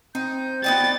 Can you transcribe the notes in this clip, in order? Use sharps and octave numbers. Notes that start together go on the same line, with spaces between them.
C4 D#4 G6
B3 D#4 D5 G5 A6